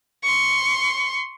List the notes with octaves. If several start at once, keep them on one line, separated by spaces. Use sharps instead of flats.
C6 C#6